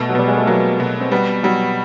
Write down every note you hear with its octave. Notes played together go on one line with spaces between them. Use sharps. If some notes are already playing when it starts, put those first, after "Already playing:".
Already playing: B2 A3
F#3
B2 G3
G#3
A3
F#3 A#3
B2
C4
G3 B3
F#3 G3